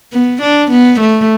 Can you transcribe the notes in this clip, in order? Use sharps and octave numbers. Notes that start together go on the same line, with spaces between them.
B3
D4
B3
A3